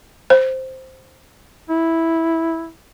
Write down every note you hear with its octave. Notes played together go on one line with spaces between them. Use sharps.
C5
E4